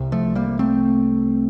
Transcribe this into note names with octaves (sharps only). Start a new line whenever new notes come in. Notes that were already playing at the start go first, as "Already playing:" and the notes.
Already playing: C2 C3
F3 A3
G3 A#3
A3 C4